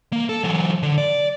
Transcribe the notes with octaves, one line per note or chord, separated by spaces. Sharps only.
A#3
A4
E3 F#3
D3
D5